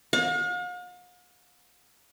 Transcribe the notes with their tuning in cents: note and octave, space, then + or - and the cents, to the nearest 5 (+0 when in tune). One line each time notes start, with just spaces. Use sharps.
F5 +45